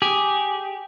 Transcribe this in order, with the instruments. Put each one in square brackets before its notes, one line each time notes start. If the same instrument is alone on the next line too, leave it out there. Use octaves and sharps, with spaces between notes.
[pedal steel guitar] G4 [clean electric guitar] G#4